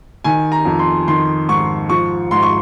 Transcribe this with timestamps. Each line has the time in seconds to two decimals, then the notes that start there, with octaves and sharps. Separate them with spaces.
0.24 D#3 G#5
0.52 A#5
0.65 F2
0.79 C6
1.07 D#3 C6
1.49 G#2 C#6
1.89 F3 C#6
2.31 G#2 C6
2.42 C#6